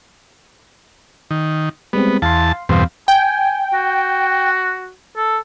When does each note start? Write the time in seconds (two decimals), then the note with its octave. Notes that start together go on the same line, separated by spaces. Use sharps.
1.31 D#3
1.93 G3 G#3 B3 C4
2.22 E2 F5 A5 C6
2.69 E2 G2 B2 C4 F5
3.08 G5 G#5
3.73 F#4
5.17 A4